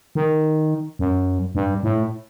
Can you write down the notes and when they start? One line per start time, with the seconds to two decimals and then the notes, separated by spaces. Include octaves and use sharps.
0.15 D#3
0.99 F#2
1.55 G2
1.83 A2